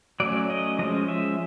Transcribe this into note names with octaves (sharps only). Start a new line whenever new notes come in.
F#3 A3 C#4 D5
D#5
F3 G#3 C#4 D#5
E5